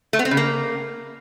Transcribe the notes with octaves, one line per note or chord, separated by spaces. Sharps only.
A3
B3
C4
C#3
A#3